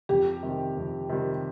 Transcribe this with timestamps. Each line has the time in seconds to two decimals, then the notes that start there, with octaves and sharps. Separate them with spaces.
0.09 F2 G4
0.43 C3 D#3 G3
0.76 F2
1.09 C3 D#3 G3